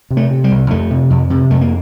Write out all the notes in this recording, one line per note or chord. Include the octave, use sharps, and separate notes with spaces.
C3
A3
C3
G3
C2
F2 A3
C3
F2
C3
F2 A3
A#3